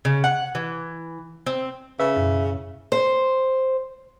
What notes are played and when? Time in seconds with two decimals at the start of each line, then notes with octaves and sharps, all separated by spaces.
0.05 C#3
0.24 F#5
0.55 E3
1.46 C4
2.00 C#3 B4 E5
2.16 F#2 B2
2.92 C5